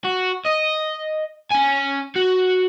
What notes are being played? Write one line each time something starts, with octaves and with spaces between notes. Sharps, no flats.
F#4
D#5
C#4 G#5
F#4